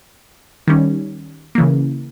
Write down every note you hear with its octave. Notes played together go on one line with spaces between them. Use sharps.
D#3 G3 C#4
C#3 E3 A#3